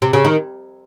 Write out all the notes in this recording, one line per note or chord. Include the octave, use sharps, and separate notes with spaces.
C3
C#3
D#3